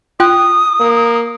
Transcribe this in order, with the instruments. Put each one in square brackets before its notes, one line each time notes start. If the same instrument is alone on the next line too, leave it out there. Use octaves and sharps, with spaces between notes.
[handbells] F4 G5 F#6 [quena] D#6
[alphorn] A#3